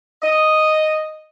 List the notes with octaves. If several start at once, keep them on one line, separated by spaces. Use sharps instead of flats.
D#5